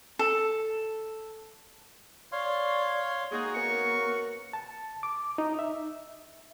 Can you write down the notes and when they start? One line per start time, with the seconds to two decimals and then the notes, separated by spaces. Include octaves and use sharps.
0.19 A4
2.32 C#5 D5 F5 C6
3.32 G#3 A#3 D#4 F#4 G#4
3.55 B3 C#4 A#4 C#6
4.53 A5
5.03 D6
5.38 D#4
5.59 E5